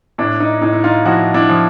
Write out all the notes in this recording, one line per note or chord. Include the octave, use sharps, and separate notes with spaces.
A2 D4 E4
D#4
A2 D#4
E4
D#4 F4
F3 E4 F#4
D4 E4
F3